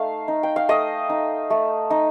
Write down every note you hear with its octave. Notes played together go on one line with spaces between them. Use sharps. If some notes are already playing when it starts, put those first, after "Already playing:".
Already playing: A3 D#4 F5
D#4
G5
F5
A3 D#5
D#4
A3
D#4